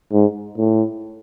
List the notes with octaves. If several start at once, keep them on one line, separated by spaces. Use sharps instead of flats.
G#2
A2